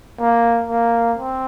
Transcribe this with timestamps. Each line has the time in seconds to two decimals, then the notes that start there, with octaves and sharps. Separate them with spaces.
0.20 A#3
0.69 A#3
1.17 C4